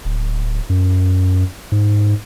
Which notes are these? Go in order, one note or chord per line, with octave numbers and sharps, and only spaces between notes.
D1
F#2
G#2